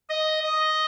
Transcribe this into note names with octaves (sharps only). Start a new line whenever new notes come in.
D#5
D#5